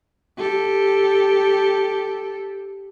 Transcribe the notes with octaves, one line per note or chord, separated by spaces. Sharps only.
G4 A4